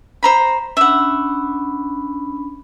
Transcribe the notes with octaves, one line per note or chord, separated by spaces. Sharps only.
C5 A#5 B5
C#4 D4 E5 F#5 B5